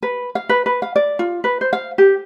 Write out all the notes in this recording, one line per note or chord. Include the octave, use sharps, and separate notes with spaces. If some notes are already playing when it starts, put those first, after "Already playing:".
B4
F5
B4
B4
F5
D5
F4
B4
C5
F5
G4